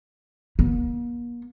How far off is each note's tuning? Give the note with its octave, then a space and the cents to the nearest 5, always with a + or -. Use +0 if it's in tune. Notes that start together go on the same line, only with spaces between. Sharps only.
A#3 +40